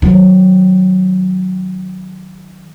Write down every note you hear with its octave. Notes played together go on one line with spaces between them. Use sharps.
D#3 F#3